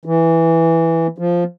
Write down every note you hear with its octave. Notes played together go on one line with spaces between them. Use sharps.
E3
F3